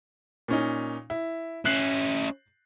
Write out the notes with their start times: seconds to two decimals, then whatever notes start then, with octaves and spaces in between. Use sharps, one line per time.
0.48 A#2 C#4 D#4
1.10 E4
1.65 C#4 E4 F#6 C7 F#7